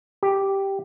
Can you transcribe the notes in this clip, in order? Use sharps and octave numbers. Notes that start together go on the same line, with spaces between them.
G4